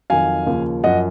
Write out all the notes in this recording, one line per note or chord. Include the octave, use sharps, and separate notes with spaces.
F2 D#3 F#3 F5 G#5
D#2 C#3 F3
F#2 F3 D#5 F#5